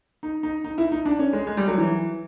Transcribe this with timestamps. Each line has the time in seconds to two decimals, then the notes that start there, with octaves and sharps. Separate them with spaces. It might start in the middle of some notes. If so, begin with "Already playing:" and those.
0.23 D#4
0.43 D#4
0.64 D#4
0.78 E4
0.92 D#4
1.05 D4
1.19 C#4
1.33 G#3
1.47 G#3
1.57 G3
1.68 F#3
1.78 E3